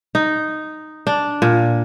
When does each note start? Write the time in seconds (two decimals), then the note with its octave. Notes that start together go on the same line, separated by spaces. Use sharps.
0.15 D#4
1.07 D4
1.42 A#2